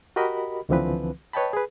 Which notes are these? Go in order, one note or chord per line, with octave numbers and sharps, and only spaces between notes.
F#4 G4 A#4 D#5 B5
C#2 D3 E3 F3 C4 B4
B4 C#5 D#5 G5 A5 B5
G#4 B4